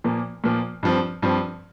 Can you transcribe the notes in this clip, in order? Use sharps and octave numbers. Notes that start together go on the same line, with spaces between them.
A#2 F3 A#3
A#2 F3 A#3
G2 F3 C4
G2 F3 C4